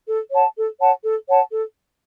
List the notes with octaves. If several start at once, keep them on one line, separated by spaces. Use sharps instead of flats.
A4
C#5 F#5 A5
A4
C#5 F#5 A5
A4
C#5 F#5 A5
A4